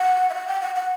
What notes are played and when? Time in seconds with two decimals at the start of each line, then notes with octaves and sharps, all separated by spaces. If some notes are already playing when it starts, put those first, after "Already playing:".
Already playing: F#5
0.30 E5
0.34 F#5
0.48 G5
0.62 F#5
0.75 F#5